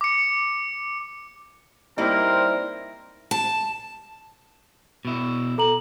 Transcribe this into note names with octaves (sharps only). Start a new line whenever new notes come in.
D6 C#7
G3 A#3 C4 D#4 E4 A#4 E5
A5
B2 E4
A4 A#5 F#7